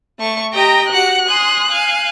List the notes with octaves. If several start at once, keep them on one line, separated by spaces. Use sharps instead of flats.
A3 C#6
G4 D#5 G5 A#5
F#4 G4 F#5 F#6
G#5 C6 D#6
F5 G#5